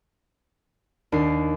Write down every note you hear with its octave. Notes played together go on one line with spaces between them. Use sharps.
D#2 D4 C7